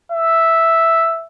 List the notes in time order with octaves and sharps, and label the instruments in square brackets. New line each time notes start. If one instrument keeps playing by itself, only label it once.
[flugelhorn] E5